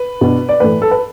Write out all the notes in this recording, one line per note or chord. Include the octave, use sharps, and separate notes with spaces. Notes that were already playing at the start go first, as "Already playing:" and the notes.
Already playing: B4
B2 B3 D4
D5
A2 E3 A3 B4
A4
B4